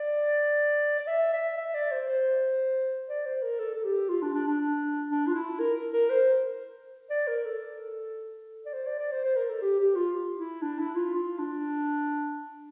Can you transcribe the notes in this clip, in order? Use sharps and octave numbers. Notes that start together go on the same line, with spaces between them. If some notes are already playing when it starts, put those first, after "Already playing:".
Already playing: D5
D5
E5
E5
E5
D5
C5
C5
D5
C5
A#4
A4
A4
G4
F4
D4
D4
D4
D4
F4
E4
A#4
A#4
C5
D5
A#4
A4
D5
C5
D5
D5
C5
C5
A#4
A4
G4
G4
F4
E4
D4
E4
F4
F4
D4